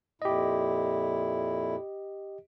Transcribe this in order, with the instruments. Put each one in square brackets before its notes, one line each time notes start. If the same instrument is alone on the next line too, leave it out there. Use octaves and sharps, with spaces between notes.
[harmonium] F2 A#2 E4 [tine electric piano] G4 D#5